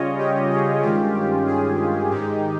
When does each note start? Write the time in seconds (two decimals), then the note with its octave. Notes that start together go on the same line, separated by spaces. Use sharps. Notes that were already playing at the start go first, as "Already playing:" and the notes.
Already playing: C#3 G3 C#4 F4 C#5 D#5
0.18 G4
0.50 G#4
0.82 G2 D#3 G#3 C#4 F4 G4
1.14 G4
1.47 G#4
2.11 G#2 D#3 G#3 D#4 G4